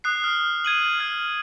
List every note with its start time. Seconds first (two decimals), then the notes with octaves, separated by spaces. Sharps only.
0.04 D#6 F#6 C7
0.24 F6
0.64 G#6 D#7 F#7
0.99 F6 G#6